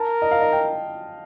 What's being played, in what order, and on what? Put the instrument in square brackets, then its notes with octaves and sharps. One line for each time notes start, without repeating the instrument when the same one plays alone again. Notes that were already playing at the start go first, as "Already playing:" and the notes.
Already playing: [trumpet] A#4 [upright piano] A5
[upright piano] D#5
F5
D#5
G5